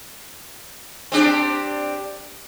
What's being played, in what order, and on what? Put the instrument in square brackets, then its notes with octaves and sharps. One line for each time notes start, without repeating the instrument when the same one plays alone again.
[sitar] C4 D4 G4